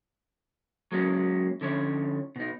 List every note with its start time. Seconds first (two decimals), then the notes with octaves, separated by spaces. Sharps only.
0.92 F#3 G#3 A#3 C#4
1.61 D3 F3 C#4 C#5
2.36 B2 D#4